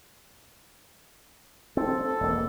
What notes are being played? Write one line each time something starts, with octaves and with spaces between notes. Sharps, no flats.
C4 A4
A4
E1 A#3